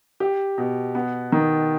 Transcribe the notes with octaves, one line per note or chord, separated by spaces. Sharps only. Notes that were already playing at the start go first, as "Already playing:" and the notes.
G4
B2
B3
D#3